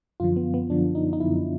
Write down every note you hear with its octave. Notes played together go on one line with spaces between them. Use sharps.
F#2 D3 F3 F4
B3
B3
F#2 D3 F3 D4
D#4
D#4
F#2 D3 F3 E4